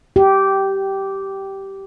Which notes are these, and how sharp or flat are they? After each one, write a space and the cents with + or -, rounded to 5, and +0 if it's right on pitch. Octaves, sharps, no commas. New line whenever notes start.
G4 -10